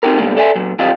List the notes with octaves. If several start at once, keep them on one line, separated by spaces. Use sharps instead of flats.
C4 D#4 F#4 G4 A#4
C#2 G2 B2 D3 G3 A#3
A4 D5 E5 G#5
A#2 F#3
E3 G3 C4 F4 G4 D#5